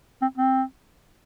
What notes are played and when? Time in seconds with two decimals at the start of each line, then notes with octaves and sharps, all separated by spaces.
0.22 C4
0.38 C4